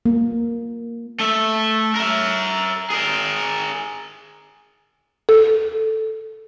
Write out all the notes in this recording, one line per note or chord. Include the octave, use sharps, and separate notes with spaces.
A#3
A3 E5
A#4 E5
G#4 A#4
A4